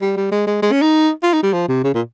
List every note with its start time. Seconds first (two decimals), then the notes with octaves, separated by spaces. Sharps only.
0.01 G3
0.17 G3
0.32 G#3
0.47 G#3
0.62 G#3
0.72 C#4
0.82 D#4
1.23 F4
1.33 D#4
1.43 G3
1.53 F3
1.68 C3
1.84 C#3
1.94 A#2